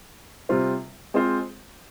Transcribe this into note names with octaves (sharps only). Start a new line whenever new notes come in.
C3 G3 C4 F4 C5
G#3 C4 F4 C5